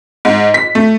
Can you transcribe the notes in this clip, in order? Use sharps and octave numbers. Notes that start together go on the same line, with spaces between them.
G#2
B6
A3